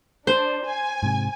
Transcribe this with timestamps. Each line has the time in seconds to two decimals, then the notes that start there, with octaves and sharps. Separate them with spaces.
0.27 D4 C5
0.65 G#5
1.03 G#2 C3